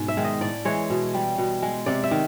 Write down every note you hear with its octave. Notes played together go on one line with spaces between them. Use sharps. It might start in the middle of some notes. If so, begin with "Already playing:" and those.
Already playing: G#2 B2
E5
D#3 G#3
D#5
A2 D5
E3 G#3 C#5
B2
G3
B2
G#3
C3 D5
E5
D#3